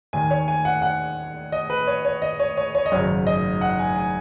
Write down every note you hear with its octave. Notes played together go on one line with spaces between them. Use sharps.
D#2 D#3 G#5
C#5
G#5
F#5
F#5
D#5
B4
C#5
C#5
D#5
C#5
C#5
C#5
D#5
G#1 F#2 C#3 C#5
D#5
F#5
G#5
G#5